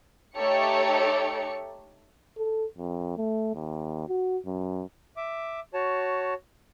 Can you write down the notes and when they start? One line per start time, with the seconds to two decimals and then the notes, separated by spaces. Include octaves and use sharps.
0.36 A3 D#4 G4 A4 C#5 C#7
2.38 A4
2.78 F2
3.17 A3
3.55 D#2
4.09 F#4
4.46 F#2
5.17 E5 D6
5.74 F#4 C#5 A5